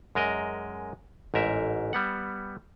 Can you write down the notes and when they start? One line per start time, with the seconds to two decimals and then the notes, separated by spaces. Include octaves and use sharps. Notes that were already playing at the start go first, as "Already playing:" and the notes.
0.15 F#2 G#3 A#4 D#5
1.34 A1 G#2 A#4 E5
1.93 G3 B3 F#5